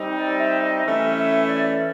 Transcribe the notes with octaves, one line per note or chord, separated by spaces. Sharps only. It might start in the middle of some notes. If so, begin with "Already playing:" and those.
Already playing: G3 C4 D#4
D5
E5
D#5
E3 A3 C#4 E5
E5
D5